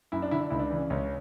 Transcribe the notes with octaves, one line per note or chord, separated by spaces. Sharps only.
F#2 E4
D4
D3 E4
D4
C#2 E4
D4
C#3 E3
C#2 C#4